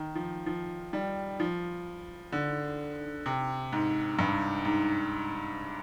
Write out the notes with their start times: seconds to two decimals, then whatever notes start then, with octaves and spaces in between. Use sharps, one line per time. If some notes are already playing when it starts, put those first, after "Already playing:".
Already playing: D#3
0.15 F3
0.46 F3
0.93 G3
1.40 F3
2.32 D3
3.26 C3
3.73 G#2
4.19 G2
4.65 G#2